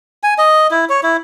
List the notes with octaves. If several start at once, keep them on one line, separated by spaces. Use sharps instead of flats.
G#5
D#5
E4
C#5
E4